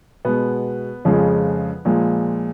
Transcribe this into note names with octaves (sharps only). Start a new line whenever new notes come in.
B2 G#3 B3
F2 C#3 F3 G#3
A#2 F3 G#3